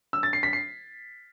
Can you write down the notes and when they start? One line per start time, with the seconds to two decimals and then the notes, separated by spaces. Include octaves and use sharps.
0.13 E6
0.23 A6
0.33 C7
0.43 B6
0.53 C7